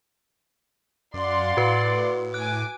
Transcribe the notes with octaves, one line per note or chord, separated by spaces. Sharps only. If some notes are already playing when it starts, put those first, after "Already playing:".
F#2 D5 F5 F#5 C6
A2 F#4 B4
G#5 D6 F#6